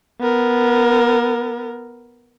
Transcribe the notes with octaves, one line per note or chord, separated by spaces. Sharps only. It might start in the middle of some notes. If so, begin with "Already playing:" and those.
B3 A#4